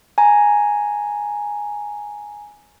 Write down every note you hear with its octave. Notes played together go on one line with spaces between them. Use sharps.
G#5 A#5